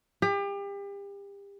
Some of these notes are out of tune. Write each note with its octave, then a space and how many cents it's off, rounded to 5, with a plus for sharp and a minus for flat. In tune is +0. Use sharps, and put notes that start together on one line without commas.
G4 +35